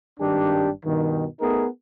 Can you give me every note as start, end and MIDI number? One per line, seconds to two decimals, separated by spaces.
0.20 0.69 32
0.20 0.69 43
0.20 0.69 51
0.20 0.69 62
0.20 0.69 67
0.86 1.25 43
0.86 1.25 47
0.86 1.25 51
1.41 1.66 57
1.41 1.66 59
1.41 1.66 63
1.41 1.66 68
1.41 1.66 70